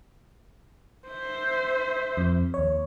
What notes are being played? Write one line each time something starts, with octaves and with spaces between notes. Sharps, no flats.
C5 E5
F2
D#2 C#5